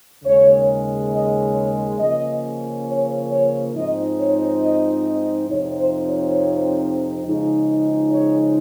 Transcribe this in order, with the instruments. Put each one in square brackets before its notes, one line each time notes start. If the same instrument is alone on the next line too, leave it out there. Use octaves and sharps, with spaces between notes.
[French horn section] D#2 C#3 G#3 C#5
D#5
C#5
C#3 F3 A#3 C#4 D#5
C#5
C#5
G#2 F3 C4 D#4 D#5
C#5
D#5
D#5
F2 C3 F3 C4 D#4 C#5
C5
C#5
C#3 F3 G#3 D#4
C#5